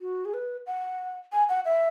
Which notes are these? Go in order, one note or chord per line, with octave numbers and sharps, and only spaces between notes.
F#4
G#4
B4
F#5
G#5
F#5
E5